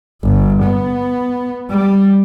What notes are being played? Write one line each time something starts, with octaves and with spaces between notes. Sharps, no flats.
G1
B3
G3